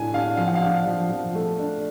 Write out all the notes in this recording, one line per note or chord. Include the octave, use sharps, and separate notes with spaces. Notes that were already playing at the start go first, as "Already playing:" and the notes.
Already playing: A2 D4 G#5
D4 F5
F3 F5
F#5
F5
D4
F3
F3
A3
D4